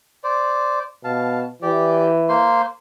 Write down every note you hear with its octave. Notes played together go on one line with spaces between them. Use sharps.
C5 D5
B2 F5 A5
E3 G4 D5
A#3 C5 C6